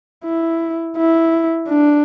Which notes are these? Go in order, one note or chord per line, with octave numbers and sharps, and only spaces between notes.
E4
E4
D4